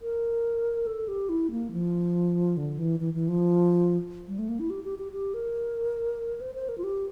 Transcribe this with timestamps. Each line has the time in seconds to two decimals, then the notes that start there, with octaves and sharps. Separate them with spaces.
0.01 A#4
0.87 A4
1.08 G4
1.29 E4
1.51 A#3
1.72 F3
2.57 D3
2.78 E3
3.00 E3
3.14 E3
3.28 F3
4.28 G3
4.39 A3
4.49 A#3
4.59 E4
4.70 G4
4.84 G4
4.99 G4
5.12 G4
5.34 A#4
6.41 C5
6.55 C5
6.69 A#4
6.78 F4
6.84 G4